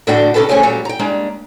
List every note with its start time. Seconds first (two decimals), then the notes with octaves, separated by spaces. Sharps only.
0.07 E2 A2 D3 D4 F#4 G5
0.34 C3 D#3 C#4 A4 B4 A5
0.49 G#3 A3 C4 C#4 G#4
0.63 A#2 F#3 G3
0.85 G5 A#5
0.99 G3 G#3 A#3 D4